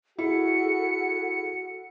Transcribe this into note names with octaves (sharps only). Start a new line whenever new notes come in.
E4 F#4 G#4 A4 F#5 C#7